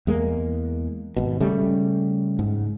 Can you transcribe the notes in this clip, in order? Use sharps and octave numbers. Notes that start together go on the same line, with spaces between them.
E2 G#3 A#3
G#1 B2
C#3 G3 A3
G#2